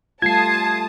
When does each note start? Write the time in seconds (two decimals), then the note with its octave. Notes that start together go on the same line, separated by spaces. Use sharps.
0.22 G3 A3 F4 A5 D#6 G#6 C7